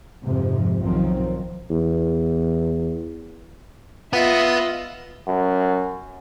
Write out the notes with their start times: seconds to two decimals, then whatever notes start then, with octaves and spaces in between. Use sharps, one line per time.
0.23 F2 G#2 C3 F3
0.78 B1 D#3 F3 F#3 C4
1.70 E2
4.13 F4 B4 D#5 E5 F#5
5.28 F#2